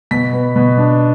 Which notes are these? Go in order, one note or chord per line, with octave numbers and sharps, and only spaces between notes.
B2 B6
B3
B2
D4